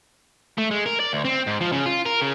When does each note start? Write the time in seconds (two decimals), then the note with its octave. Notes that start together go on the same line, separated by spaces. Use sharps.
0.58 A3
0.71 G#3
0.86 A#4
1.00 D5
1.13 D2
1.25 C4
1.47 G#2
1.61 F3
1.72 C#3
1.86 F4
2.06 A#4
2.21 C#3